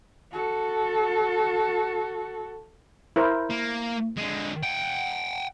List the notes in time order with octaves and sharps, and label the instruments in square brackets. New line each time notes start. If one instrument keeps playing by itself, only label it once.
[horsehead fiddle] F#4 A4
[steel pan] E4 A#4 C5
[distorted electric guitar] A#3
D3 G#3
F#5 G5